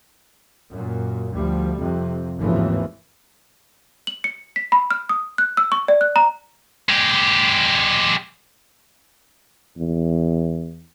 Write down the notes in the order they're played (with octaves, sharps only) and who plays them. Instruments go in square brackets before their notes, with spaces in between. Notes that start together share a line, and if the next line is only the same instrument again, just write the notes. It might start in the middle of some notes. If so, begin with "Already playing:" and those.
[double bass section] F#2 A#2
D2 F3 G3
F2 C3
G#1 D#2 A2 C#3 E3 F3
[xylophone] F#7
C#7
B6
B5
F6
D#6
F#6
E6
C#6
D5
F#6
A#5
[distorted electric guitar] G#3 G4
[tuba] E2